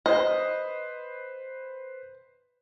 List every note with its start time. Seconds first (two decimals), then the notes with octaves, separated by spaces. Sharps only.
0.06 B4 C5 D#5